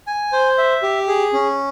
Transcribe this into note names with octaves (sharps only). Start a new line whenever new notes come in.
G#5
C5
E5
G4
G#4
C#4